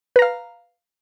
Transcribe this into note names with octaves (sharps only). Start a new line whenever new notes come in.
B4 F5 A#5